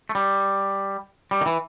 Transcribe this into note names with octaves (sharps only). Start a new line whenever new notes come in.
A3
G3
G3
D#3
E3